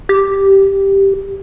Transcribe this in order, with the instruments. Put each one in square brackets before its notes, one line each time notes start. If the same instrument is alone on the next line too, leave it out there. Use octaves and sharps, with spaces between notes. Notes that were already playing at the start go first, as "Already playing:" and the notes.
[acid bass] G4